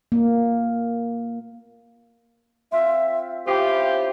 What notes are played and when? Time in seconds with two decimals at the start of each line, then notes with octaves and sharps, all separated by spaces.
0.12 A#3
2.72 C4 F4 E5
3.46 C#4 E4 F4 G4 C5